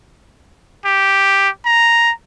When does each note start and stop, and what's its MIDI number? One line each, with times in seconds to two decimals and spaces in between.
0.86 1.49 67
1.66 2.12 82